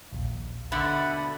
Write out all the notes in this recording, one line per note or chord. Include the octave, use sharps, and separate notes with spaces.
A#1 D#2
B2 D3 A3 F#5 B5 D6 A6